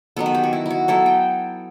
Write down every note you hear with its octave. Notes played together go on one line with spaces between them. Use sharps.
D#3 F#3 B3 A4
B4
G4
F#4
E4
E4 F#4
F#3 B3 E4 A4
G5